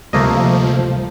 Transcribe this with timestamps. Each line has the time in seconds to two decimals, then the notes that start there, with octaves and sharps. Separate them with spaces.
0.13 D2 C3 F3 G3 A3 A#3 D#5